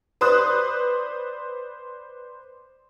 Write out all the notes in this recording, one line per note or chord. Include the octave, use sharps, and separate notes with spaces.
B4 C5 D5 D#6 F#6